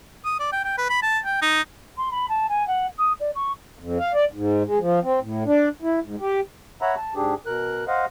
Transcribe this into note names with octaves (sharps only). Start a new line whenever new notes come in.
D#6
D5
G5
G5
B4
B5
A5
G5
D#4
C6
B5
A5
G#5
F#5
D#6
D5
C#6
F2
F5
D5
G#2
G#3
F3
C4
A2
D4
E4
G#2
G4
C#5 E5 F#5 A#5 B5
A5
G#2 D4 G4 G#4
B2 A#4 F#6
C5 D#5 F5 F#5